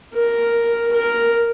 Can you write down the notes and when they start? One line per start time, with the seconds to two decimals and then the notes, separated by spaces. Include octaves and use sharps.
0.14 A#4
0.93 A#4